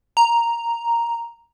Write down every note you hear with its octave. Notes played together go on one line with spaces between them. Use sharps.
A#5